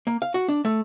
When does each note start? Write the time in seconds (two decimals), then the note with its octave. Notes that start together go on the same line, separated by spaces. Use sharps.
0.07 A#3
0.22 F5
0.34 F#4
0.48 D4
0.65 A3